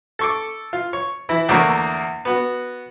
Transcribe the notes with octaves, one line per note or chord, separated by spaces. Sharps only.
A4 C#6 D6
F4
C#5
E3 E4
E2 D3 A3 A#3 A#4 C#5
B3 F#4